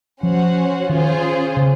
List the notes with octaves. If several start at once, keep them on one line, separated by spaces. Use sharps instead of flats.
F3 C#4 F#4 C5 F#5
D#3 C#4 F4 G#4 C5
C#3